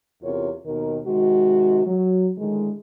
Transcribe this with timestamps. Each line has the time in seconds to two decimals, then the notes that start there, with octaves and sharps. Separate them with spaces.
0.23 E2 C3 F4 A#4 C#5
0.65 D#2 B2 D#3 A#4
1.05 C3 D#3 G#3 F#4
1.86 F#3
2.38 A2 D3 D#3 G#3